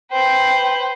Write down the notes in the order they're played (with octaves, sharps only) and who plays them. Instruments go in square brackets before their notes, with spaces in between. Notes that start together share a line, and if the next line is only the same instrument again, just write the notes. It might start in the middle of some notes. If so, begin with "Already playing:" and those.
[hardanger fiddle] B4 C5 [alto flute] G5